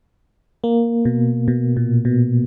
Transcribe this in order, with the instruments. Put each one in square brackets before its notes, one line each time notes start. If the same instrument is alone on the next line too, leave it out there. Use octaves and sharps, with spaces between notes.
[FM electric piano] A#3
B2
B2
A#2
B2